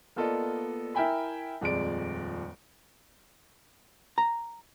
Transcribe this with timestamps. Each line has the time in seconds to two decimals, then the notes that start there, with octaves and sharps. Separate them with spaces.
0.16 A#3 B3 F4 A4 D5 D#5
0.95 E4 A#4 E5 G5 G#5 B5
1.61 D#1 F2 G#3 D5 D7
4.18 A#5